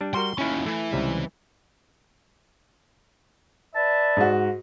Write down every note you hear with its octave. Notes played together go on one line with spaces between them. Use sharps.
G3 D4
G3 F#4 A#4 C6
D#2 C#4 E4 C#5
E3 A3
C#2 C3 G3
B4 D5 E5 A5
G#2 F#4